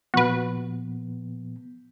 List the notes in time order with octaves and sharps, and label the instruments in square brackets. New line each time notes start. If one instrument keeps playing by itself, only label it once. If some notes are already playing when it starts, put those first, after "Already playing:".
[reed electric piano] A#2 F3 B3 [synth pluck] F#4 B4